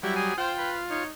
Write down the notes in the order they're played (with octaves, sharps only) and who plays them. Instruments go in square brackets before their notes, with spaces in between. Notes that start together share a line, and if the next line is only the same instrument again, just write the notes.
[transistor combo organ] F#3 G3 [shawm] E4
[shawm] G#4 [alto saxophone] G#5
[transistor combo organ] F4 [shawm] C5 [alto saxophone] G5
[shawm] B4
[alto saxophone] D#4 [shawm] C#5